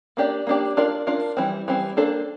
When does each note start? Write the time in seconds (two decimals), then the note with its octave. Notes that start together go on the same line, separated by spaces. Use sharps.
0.17 A#3 D4 G4 D5
0.47 A#3 D4 G4 D5
0.77 D4 F4 A#4 D5
1.07 D4 F4 A#4 D5
1.37 E3 G3 C4
1.68 E3 G3 C4
1.97 A#3 D4 A4 C5